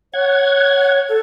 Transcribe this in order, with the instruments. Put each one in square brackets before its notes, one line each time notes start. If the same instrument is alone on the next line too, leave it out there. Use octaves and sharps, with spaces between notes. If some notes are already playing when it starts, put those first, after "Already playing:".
[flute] C#5 [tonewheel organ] F#5 G#6
[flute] A4